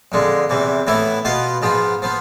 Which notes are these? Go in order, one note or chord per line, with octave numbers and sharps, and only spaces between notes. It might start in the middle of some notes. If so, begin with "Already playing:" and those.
F2 D3 G#3
E2 C3 E3
A2 E3 B3 E4
B2 B3 F4
G#2 F3 B3
F3 B3